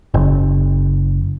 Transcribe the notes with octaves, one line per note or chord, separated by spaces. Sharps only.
F#1